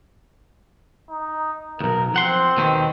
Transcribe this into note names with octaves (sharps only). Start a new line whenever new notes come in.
D#4
B1 E2 A#4
F3 C4 F#5 C6
D#2 B2 D#3